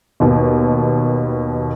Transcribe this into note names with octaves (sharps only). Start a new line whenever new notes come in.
D#2 B2